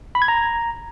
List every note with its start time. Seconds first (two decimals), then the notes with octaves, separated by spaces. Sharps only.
0.15 B5
0.22 G#6
0.28 A#5